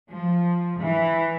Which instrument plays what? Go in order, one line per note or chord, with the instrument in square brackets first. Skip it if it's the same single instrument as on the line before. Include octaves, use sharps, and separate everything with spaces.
[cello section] F3
E3